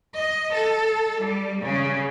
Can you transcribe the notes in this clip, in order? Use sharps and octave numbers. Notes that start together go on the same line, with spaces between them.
D#5
A4
G3
C#3